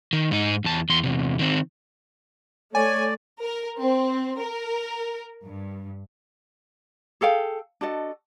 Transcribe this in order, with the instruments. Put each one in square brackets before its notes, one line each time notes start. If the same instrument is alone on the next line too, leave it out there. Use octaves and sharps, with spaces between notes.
[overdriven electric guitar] D#3
G#2 D#4
E2 A5
E2 C6
E2 C3
D#3 C4
[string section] A3 [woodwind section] C#5 [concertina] D5 [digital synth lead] G#5
[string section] A#4
C4
A#4
G2
[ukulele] G#4 A4 F5 G5
D4 F#4 A4 D#5